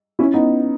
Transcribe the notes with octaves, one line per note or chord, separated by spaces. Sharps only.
C#4 E4
B3 D#4